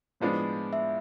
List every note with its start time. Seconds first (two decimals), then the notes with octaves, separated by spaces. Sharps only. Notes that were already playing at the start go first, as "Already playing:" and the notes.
0.20 A2 F3 G#3 B3 D4
0.73 E5